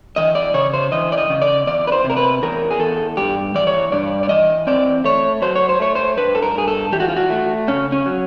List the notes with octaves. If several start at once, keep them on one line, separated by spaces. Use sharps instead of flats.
E3 D#5
D5
C#3 C#5
C5
E3 D#5
D5
D#5
C#3
D5
E2 D5
B4
C5
C3
A#4
B4
E2 A#4
G#4
E2 A4
G2 G4
E3 D5
C#5
G2 D5
D5
E3 D#5
C4 D5
A3 C#5
F#3 C5
C#5
C5
A3 C#5
C5
G2 B4
A4
A#4
G2 G#4
A4
E3 G4
F#4
F4
F#4
A3
C#3 C#4
C#4
F#3